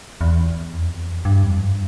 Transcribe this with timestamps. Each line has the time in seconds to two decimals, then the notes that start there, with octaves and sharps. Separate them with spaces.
0.21 E2
0.73 F2
1.25 G2
1.43 F2
1.60 G2